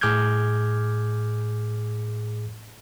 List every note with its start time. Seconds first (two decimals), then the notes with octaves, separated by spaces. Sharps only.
0.01 A2 G#4 D6 F6 G6 G#6